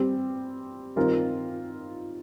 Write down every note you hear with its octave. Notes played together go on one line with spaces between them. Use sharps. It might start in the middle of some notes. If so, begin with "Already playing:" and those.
Already playing: G3 C4 G4
D#3 G3 C4 F4 A#4